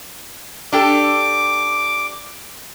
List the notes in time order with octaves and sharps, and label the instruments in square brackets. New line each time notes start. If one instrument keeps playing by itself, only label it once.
[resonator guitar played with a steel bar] D4 G4 A4 [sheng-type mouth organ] D6